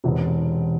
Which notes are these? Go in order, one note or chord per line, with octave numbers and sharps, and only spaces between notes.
E1 E2 C3